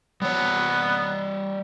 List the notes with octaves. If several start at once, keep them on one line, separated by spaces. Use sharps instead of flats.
G3 B3 C#5